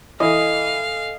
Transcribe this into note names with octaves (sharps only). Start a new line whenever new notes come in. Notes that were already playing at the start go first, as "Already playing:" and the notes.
E3 A4 D#5 F5 G#5